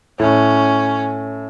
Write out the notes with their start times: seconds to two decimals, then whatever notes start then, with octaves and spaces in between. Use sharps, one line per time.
0.20 A2 C#4